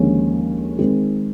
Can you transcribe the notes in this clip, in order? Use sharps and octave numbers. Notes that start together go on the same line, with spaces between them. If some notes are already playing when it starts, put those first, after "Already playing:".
Already playing: D#2 D3 F3 G#3 C#4
D#3 G#3 C4